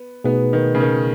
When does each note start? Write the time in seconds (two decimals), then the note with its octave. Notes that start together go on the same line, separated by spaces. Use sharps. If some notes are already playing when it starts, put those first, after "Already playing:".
Already playing: B3
0.24 B2 A3 B3 D#4 G#4 B4
0.53 D#3
0.75 C#3
0.80 D#3